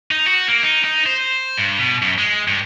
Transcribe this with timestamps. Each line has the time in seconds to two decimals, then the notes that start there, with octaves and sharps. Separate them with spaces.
0.11 D#4
0.26 F#4
0.48 A#3
0.63 D#4
0.84 D#4
1.06 C5
1.58 G2
1.79 B2
2.02 F#2
2.18 G#3
2.48 G2